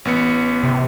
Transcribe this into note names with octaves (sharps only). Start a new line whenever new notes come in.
A1 B3 C#7
C3